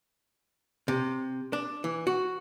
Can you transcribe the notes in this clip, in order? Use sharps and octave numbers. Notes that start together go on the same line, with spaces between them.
C3
D4
E3
F#4